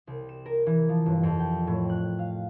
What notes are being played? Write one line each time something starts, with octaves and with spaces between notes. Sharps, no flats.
C2
E7
A#4
E3
F3
G1
F2
G5
A2
F#6
F5